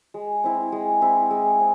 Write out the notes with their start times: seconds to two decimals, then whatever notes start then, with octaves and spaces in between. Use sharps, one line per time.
0.14 G#3
0.44 C4 E4
0.72 G#3
1.02 C4 E4
1.31 G#3
1.60 C4